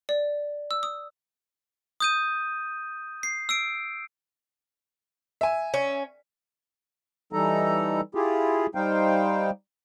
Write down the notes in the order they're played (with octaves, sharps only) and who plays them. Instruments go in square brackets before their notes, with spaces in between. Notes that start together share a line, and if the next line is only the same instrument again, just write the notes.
[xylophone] D5
E6
D#6
[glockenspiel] D#6 G6 D#7
C7
E6 C7 D7
[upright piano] E5 G#5
[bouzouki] C#4
[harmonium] E3 G3 D#4 A4 A#5
E4 F4 G4 G#4
G3 D#4 C5 F5 G5